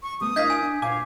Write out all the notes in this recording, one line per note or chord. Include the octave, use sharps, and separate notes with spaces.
C#6
G3 A3 B3 D#6
D4 E4 A#4 D#5 F5 G6 G#6 B6
G#5
D4
A#2 F5 G#5 D6